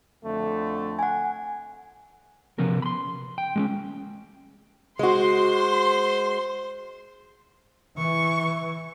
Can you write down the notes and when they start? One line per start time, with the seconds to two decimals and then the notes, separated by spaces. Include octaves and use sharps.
0.24 F2 D3 A3
0.99 F#5 G#5
2.58 C3 F3 B3 C#4 A#4
2.82 B5 C6
3.38 G5
3.56 G#3 A#3 C#4
4.99 G#3 F#4 C5 C6
7.98 E3 C#6